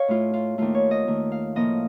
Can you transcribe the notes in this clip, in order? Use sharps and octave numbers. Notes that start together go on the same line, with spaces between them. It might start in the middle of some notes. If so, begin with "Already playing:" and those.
Already playing: C#5 D#5 F5
A2 A3 F4
F4
D#2 D#3 A3 F4
C#5
D#5
D#2 D#3 A3
F5
A2 F3 A#3 D#5